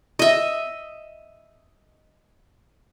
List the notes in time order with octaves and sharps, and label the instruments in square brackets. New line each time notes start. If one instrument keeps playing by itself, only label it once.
[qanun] D#5 E5